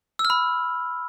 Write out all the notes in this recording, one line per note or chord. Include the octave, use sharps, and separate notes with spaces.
E6
F6
B5